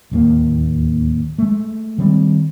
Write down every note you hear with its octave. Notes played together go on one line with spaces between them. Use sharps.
D1 D#2 A#3
G#3 A3
D#3 G3 C4